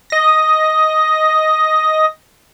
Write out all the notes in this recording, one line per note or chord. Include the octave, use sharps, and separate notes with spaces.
D#5 A#6